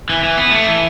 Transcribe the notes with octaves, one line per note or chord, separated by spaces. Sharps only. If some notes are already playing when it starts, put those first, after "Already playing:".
E3
E3
B3
A3
E3